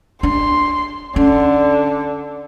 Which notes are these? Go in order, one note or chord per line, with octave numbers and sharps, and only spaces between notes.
D4 C6
D3 C#4